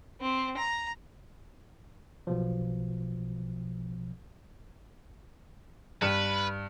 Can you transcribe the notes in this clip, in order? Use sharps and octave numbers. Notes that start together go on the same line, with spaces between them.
C4
A#5
B1 B2 F3
G2 B4 C#7 E7